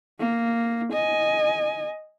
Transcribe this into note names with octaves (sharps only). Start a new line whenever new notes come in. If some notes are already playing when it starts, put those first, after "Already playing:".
A#3
D#5 G#5